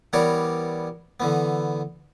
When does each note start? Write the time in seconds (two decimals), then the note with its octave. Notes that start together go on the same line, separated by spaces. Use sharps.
0.13 E3 G3 B3 A#4 C#5 D5
1.20 D3 E3 B3